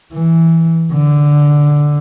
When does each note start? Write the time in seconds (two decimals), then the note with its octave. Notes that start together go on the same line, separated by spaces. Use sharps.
0.13 E3
0.92 D3